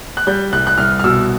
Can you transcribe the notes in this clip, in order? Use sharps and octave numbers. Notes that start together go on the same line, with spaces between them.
F#6
G3 G6
C2 F#6
F#6
C2 F6
F6
B2 E6